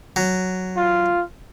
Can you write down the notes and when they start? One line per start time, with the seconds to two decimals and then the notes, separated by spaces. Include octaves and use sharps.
0.16 F#3
0.77 F4